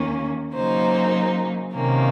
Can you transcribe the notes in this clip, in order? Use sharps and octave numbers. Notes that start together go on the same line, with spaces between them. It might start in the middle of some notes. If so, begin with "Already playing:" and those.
Already playing: D#2 D#3 A#3 C#4
C#3 F#3 A#3 D#4 C5
C3 D#3 A#3 C#4